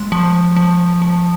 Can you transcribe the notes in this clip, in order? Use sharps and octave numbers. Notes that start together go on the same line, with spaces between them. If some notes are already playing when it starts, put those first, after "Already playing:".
Already playing: G#3 C6
F3
F3
F3